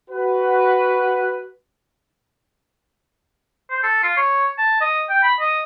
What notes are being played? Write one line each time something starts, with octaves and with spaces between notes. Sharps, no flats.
F#4 B4
C5
A4
F4
C#5
A5
D#5
G5
B5
D#5